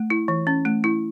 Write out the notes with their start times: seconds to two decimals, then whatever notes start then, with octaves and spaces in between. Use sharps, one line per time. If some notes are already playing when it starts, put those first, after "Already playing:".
Already playing: A3
0.10 E4
0.28 E3
0.47 C#4
0.65 A3
0.84 E4